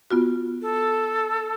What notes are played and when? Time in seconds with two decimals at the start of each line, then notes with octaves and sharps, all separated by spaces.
0.11 B3 F4 F#4
0.62 A4